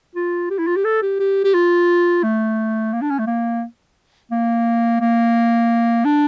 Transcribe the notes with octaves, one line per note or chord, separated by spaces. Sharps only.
F4
G4
E4
F4
G4
A4
G4
G4
G4
F4
A3
A#3
D4
C#4
A3
A#3
A#3
A#3
D4